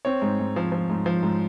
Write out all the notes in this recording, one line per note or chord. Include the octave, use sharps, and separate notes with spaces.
C4 C#5
G#2
G#2
F3
F3
G#2
F3
G#2